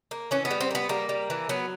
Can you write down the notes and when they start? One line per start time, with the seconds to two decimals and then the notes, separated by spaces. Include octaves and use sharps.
0.11 A#3
0.31 E3 C#4
0.45 B3
0.51 G3
0.61 C4
0.71 A#3
0.75 B3
0.89 G3 A#3
1.09 G3
1.30 E3
1.49 F#3 B3